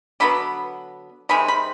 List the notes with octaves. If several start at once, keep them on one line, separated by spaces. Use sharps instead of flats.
D3 F#3 B3 B5
C3 D#3 G#3 C4 B5
B5